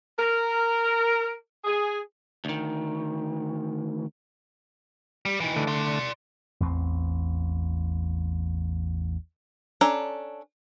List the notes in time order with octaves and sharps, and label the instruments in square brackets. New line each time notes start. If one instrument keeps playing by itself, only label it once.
[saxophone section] A#4
G#4
[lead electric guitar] D2 D#3
G3
D#3 E3
[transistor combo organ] D3 A3
[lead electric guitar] D5 C6
[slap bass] A1 E2 C4
[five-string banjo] C#4 D4 A4 A#5